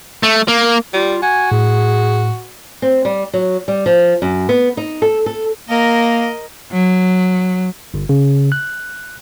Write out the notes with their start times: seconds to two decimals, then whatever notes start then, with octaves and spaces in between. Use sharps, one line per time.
0.23 A3
0.48 A#3
0.94 G3 F4
1.23 F#4 G#5
1.52 A2 G#4
2.82 C4
3.05 G3
3.33 F#3
3.68 G3
3.86 F3
4.22 F#2
4.49 B3
4.77 D#4
5.02 A4
5.26 A4
5.69 A#3 A#4 D#5
6.72 F#3
7.94 G1
8.09 C#3
8.52 F#6